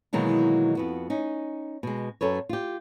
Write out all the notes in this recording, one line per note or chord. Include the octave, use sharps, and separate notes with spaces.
B2 D#3 E3 F#3 G#3 A#3
F2 B3 F#4
C#4 D#4
B2 G#3
F#2 A4 B4 C#5
F4 G4